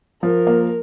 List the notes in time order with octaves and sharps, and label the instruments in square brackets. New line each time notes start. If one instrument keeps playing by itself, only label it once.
[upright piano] F3 [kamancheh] A#4
[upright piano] A#3